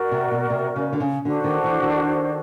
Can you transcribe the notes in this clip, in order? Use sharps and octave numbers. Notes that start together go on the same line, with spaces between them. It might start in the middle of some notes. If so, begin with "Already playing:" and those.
Already playing: F#4 A#4 D5
C3
B2
C3
C#3
D3
C#3
D3 D4 F#4 A4 C5
D#3
E3
D#3